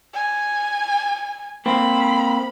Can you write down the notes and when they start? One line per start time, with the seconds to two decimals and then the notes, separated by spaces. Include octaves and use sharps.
0.14 G#5
1.66 A#3 C4 B5